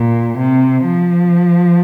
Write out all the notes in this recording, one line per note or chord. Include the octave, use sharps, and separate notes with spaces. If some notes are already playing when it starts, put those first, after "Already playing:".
Already playing: A#2
C3
F3